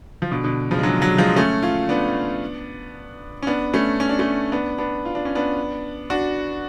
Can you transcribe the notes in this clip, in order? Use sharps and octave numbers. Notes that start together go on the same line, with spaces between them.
F3
B2 D3
B2 D3
C#3 F3
G#3
D3 F#3
D3 F#3
F3 G#3
A3 C#4
C#4 F4
B3 D4
C#4
B3 D4
A3 C#4
C#4
D4
A3 C#4
B3 D4
B3 D4
F4
D4
C#4
B3 D4
D4 F#4